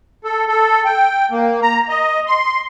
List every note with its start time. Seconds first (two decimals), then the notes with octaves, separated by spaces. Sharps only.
0.24 A4
0.47 A4
0.85 G5
1.31 A#3
1.62 A#5
1.89 D#5
2.27 C6